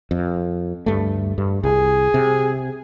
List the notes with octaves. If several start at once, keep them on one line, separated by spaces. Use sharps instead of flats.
F2
D2 G2 A3
G2
C2 G#4
C3